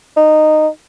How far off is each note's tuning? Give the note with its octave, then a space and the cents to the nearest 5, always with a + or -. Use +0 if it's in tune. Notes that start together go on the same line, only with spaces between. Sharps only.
D#4 -15